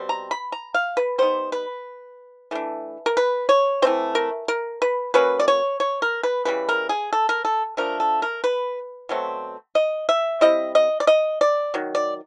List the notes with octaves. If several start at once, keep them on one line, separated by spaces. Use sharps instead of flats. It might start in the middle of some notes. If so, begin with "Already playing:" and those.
Already playing: B2 G3 C4
A#5
B5
A#5
F5
B4
G3 B3 D#4 C5
B4
E3 A3 D4
A#4
B4
C#5
E3 A3 C4 C5
A#4
A#4
B4
F#3 A#3 C#4 B4
D5
C#5
C#5
A#4
B4
C#3 E3 G3 B4
A#4
G#4
A4
A#4
A4
D3 F3 A3 D4 A#4
A4
A#4
B4
B2 F#3 A3 C4
D#5
E5
G3 C4 E4 D#5
D#5
D5
D#5
D5
D#3 F#3
D5